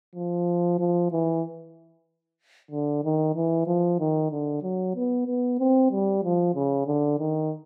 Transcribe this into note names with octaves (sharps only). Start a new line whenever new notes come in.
F3
F3
E3
D3
D#3
E3
F3
D#3
D3
F#3
B3
B3
C4
G3
F3
C#3
D3
D#3